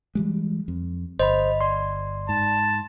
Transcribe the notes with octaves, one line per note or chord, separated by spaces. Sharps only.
E3 G3 G#3
F2
G1 C5 D#5 B5
D5 C6
G#2 A5